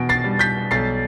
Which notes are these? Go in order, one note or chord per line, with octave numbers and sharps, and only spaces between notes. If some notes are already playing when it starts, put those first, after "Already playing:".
Already playing: E2 B2 D7
A6 C7
G3
G6 B6
B1 A6 C7